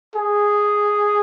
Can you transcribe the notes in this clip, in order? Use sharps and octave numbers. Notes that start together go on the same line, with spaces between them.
G#4